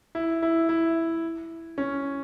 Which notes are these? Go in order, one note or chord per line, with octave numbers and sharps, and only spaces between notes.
E4
E4
E4
C#4